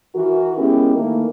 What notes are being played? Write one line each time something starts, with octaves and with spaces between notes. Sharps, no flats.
E3 F#4 A#4
G#3 B3 C#4 E4 G4 A#4
D#3 E3 A3 A#3